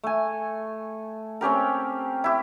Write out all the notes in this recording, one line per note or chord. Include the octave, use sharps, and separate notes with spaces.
A3 G#5
C4 C#4 G4 A#4
E4 G4